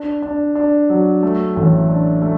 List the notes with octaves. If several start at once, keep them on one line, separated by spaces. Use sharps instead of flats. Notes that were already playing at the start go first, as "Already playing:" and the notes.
Already playing: D4
D4
D4
F#3
A3
A1
D4
A3